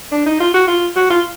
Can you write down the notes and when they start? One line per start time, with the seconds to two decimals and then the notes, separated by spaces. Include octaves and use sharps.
0.12 D4
0.26 D#4
0.40 F4
0.54 F#4
0.68 F4
0.96 F#4
1.10 F4